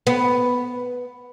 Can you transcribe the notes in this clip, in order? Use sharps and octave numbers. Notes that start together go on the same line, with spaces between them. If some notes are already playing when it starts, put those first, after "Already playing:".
B3